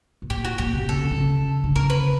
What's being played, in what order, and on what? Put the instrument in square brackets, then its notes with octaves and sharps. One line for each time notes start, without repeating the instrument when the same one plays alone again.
[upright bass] B2
[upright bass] A#2 [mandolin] G4
[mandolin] F#4
[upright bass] A#2 [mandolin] G4
[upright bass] C3
[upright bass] C#3 [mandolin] A4
[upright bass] C#3
D3
C#3
D3
[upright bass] C#3 [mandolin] A#4
[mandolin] B4